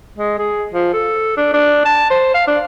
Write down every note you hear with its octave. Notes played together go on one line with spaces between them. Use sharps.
G#3
G#4
F3
A4
D4
D4
A5
C5
F5
D4